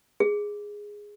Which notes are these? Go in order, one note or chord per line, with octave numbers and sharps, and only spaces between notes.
G#4